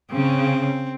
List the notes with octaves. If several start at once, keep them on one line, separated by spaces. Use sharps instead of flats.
C#3 C4